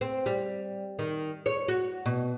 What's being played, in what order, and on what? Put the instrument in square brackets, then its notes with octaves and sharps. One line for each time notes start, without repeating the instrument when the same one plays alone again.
[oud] C4
G3
D#3
C#5
F#4
B2